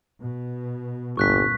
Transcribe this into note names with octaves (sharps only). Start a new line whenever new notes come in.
B2
G1 C2 G2 A#2 C#6 F#6 B6